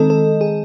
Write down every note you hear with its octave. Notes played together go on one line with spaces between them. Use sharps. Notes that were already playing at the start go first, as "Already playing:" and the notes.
Already playing: D#3 G#3 C4 A4 D#5
A4
G#4